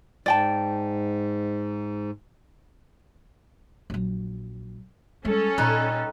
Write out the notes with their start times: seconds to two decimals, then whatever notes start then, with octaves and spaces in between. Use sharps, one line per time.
0.26 G#2 D5 G5 A5
3.90 A#1 F#3
5.25 G3 G#3 C#4 A4
5.58 A#2 G3 D#4 B4